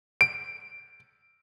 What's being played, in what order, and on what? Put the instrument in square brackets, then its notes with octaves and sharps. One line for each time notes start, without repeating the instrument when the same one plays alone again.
[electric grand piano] D7